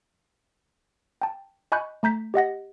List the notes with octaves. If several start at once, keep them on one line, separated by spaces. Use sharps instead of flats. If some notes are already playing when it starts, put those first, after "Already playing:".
G5 A5
D#5 G#5 B5 C#6 F#6 G6
A3 A#5 G6 B6
G4 D#5 F#5 A#6